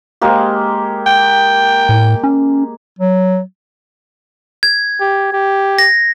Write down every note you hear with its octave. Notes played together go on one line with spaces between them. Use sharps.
G#3 A#3 G4
G5
A2
C#4
F#3
G#6
G4
G4
A#6